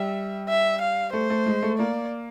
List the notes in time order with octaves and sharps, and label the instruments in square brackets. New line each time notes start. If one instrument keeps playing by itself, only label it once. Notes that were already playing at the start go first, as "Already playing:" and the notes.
Already playing: [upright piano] G3 [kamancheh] E5
[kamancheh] E5
F5
[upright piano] A3 [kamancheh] C5
[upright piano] A3
G#3
A3
[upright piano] A#3 [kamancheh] D5